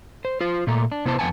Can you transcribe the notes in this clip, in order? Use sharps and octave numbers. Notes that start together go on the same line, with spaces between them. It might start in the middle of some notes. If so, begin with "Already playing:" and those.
C5
F4 C5
A#2 A3 A#5
D4
C3 B3 E4 B4 C5 A5
F2 B3 F#5 G#5 A5